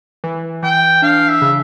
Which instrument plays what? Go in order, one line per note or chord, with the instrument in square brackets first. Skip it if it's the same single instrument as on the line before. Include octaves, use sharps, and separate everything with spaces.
[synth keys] E3
[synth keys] E3 [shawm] G5
[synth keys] D4 [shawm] F5
[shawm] E5
[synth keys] C#3